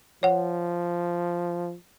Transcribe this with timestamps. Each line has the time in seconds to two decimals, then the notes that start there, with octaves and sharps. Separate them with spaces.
0.23 F3 C#5 F#5